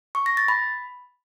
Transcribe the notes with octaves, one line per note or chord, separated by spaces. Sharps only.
C#6
A#6
A6
B5